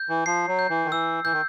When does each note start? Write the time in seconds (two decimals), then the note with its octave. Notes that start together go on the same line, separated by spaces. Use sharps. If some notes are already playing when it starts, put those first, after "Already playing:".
Already playing: G6
0.09 E3
0.26 F3 C7
0.47 F#3
0.59 G6
0.70 E3
0.85 D#3
0.91 E3 E6
1.24 E3 G6
1.33 D#3